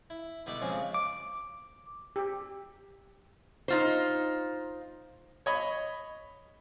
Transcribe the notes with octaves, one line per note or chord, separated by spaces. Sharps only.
E4
B2 D3 G3 A4 D5 E5
C#3 F3 G#3 C4 C#4
D6
G4
D#4 F4 C5
C#5 D#5 B5